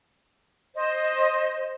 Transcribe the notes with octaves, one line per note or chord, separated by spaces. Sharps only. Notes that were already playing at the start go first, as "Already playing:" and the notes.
C5 D#5